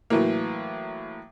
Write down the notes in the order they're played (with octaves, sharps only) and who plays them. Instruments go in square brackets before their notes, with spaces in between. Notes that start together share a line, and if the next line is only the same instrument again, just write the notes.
[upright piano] A2 E3 F#3 A#3